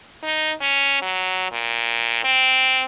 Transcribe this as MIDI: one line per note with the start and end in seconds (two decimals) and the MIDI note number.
0.23 0.52 63
0.61 1.01 61
1.01 1.47 54
1.52 2.22 46
2.24 2.86 60